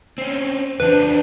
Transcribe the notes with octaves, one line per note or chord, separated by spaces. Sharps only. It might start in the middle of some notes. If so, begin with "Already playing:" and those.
C4 C#4
F2 E3 D4 B4 C5